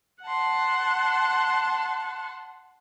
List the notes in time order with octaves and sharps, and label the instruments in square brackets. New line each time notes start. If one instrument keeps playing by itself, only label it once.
[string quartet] F#5 A5 C6